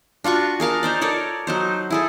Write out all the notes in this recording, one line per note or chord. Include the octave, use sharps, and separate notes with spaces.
D4 F4 F#4 C#6
G#4 A#4 F5 A5
D#4 C5 D5
A4 A#4 C#5 D5
F#3 D#4 C5
E4 G#4 A4